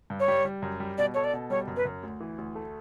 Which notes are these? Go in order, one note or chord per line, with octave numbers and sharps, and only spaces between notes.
G2
C#5
G3
G3
F#2
G3
B2 D5
A4 C#5
D5
B2
G3 C#5
F#2
B4
F#2
D2
E3
D2
A3